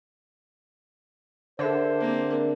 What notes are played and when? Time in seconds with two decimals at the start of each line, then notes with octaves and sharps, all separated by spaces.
1.59 D3 G#4 A#4 C5 E5
2.00 A#3 C4